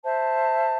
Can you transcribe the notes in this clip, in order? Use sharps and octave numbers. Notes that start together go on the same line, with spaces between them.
C5 E5 A5